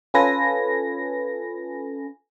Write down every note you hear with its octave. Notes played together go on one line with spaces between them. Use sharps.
C#4 F4 A4 B4 G#5 A#6